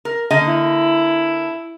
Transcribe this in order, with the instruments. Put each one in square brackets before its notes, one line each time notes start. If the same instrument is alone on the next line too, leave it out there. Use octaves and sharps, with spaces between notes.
[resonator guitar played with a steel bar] A#4
D3 A#3 D#5
[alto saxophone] E4